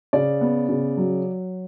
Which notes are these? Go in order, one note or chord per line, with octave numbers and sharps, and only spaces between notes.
C#3 D5
B3
C#3
F#3